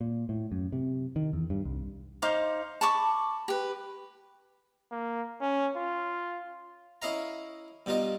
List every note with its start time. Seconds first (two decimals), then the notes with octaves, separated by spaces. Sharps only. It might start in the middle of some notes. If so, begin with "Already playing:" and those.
0.01 A#2
0.29 A2
0.52 F#2
0.72 C3
1.16 D#3
1.33 E2
1.50 G2
1.65 C2
2.22 D#4 C5 F5 D6
2.81 A5 B5 C#6 D6
3.48 G4 B4
4.92 A#3
5.41 C#4
5.77 F4
7.02 C#4 E4 D#5 F5 A#5
7.86 G2 B2 D#4 F4 D#5